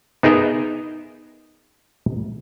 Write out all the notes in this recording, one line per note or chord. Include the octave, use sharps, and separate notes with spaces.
B3 D#4 G#4 A#4 D#5 E5